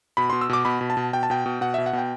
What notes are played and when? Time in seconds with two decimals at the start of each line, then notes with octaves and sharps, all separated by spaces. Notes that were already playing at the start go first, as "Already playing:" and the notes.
0.17 B2 B5
0.30 B2 C6
0.41 E6
0.49 B2 D6
0.65 B2 B5
0.81 B2
0.90 A5
0.97 B2
1.13 B2 G5
1.23 A5
1.30 B2 G5
1.46 B2
1.61 B2 F#5
1.74 B2 E5
1.86 F#5
1.93 B2 G5